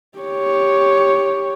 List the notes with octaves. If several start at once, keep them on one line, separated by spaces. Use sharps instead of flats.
G4 C#5